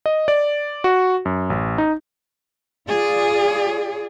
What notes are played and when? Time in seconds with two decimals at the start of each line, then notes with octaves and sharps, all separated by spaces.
0.06 D#5
0.28 D5
0.84 F#4
1.25 F#2
1.50 A1
1.78 D#4
2.88 F4 G#4 D5